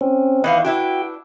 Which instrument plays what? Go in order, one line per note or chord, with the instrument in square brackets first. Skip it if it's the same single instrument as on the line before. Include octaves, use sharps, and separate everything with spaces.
[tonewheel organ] C4 C#4
[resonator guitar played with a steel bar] E2 D#3 F5 [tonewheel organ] B4 D#5 F#5
[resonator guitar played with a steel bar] D4 E4 B4 [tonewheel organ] F#4 G5